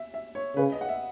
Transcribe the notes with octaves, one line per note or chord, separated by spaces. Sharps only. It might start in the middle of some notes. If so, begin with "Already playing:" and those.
Already playing: E5
E5
C#5
C#3 B4
D#5
F#5
E5